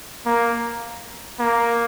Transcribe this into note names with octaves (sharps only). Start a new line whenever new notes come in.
A#3
A#3